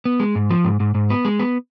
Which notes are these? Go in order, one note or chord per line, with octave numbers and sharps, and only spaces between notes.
B3
G#3
G#2
F3
G#2
G#2
G#2
B3
G#3
B3